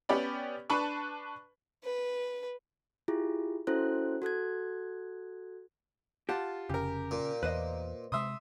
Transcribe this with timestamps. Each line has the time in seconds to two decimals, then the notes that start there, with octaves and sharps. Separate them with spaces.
0.09 B3 C#4 G4 D5 B5
0.70 D4 B4 A5 B5 C#6
1.84 B4
3.08 E4 F4 G4 G#4
3.67 C#4 E4 F#4 A4 C5 F#6
4.22 F#4 A4 F#6 G#6
6.29 F4 G4 F#5 A5
6.69 F1 C#3 G4 A#4
7.11 A#2
7.43 E2 B4 C5 D#5
8.12 C3 G#3 E5 C6 D#6